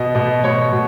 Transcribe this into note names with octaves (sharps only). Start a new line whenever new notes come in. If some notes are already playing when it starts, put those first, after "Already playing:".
Already playing: B2 D#5
B2 D#5
B2 C#5
B2